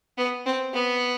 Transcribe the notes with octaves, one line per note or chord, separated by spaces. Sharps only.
B3
C4
B3